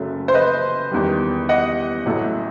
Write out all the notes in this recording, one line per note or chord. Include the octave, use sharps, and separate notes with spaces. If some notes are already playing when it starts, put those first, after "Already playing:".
Already playing: F#1 F#2 F#3 A3
C5
B4 D#5
E2 D#3 G3
D#5 F#5
A1 A2 F#3 A3